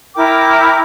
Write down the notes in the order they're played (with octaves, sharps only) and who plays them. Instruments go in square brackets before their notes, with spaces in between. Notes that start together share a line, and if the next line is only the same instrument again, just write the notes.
[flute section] E4 A#4 G5 D6